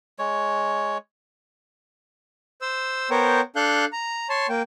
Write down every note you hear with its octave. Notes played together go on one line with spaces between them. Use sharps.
G#3 C#5
C5 E6
B3 A#4 C5 C#5 G5
D4 A4 F5 F#6 G6
A#5
C#5 A5 C6
A#3 G5